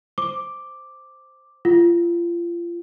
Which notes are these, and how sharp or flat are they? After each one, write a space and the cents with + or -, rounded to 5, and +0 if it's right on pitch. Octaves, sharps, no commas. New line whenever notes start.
C5 +0 D6 +0
F4 -30 F#5 +0